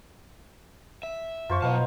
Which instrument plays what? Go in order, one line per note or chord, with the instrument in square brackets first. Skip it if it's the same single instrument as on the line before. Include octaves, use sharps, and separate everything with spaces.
[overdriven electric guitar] E5
[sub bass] F#2 [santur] F3 C5 C#6
[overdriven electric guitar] F#2 A5 [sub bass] B2 [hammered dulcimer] F#3 B3 D#4 [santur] F5